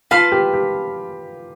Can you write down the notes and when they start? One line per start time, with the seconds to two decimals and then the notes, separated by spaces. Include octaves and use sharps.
0.11 F4 B4 F5 A5 C6
0.32 G4
0.53 G4